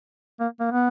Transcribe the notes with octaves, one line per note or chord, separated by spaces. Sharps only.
A#3
A#3
B3